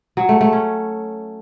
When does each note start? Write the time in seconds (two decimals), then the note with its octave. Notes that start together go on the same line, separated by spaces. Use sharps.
0.17 F#3
0.29 A3
0.41 A3
0.53 C#4